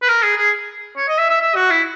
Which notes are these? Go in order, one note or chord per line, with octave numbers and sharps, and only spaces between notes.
B4
A#4
G#4
G#4
C#5
D#5
E5
E5
E5
F#4
E4